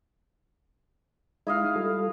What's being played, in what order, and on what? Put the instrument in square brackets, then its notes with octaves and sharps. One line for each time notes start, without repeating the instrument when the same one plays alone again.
[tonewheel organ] G#3 D#4 [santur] E4 D#5 F5
[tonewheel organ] G3 F4 A4